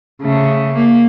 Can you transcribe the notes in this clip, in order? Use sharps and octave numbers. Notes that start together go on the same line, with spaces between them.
C#3 A3
A#3